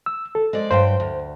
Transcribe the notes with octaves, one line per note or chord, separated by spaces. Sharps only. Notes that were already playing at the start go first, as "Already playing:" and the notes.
E6
A4
G#3 C5 D5
G2 F#3 C5 G5
D2